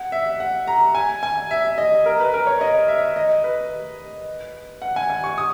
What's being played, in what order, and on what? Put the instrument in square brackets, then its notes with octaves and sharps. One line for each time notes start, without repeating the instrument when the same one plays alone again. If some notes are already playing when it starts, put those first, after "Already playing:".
Already playing: [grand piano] F#5
E5
F#5
A#5
G#5
G#5
E5
D#5
A#4
B4
A#4
C#5
D#5
E5
D#5
B4
F#5
G#5
G#5
C#6
D#6